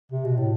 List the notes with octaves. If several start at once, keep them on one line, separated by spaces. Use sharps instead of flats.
C3
B2
A2